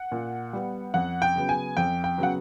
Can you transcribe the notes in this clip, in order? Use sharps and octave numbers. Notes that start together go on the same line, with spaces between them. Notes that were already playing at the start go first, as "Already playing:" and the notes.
Already playing: F#5
A#2
G3 B3
F2 F#5
G5
C#3 F#3 B3
G#5
F2 G5
G5
C#3 F#3 B3
F#5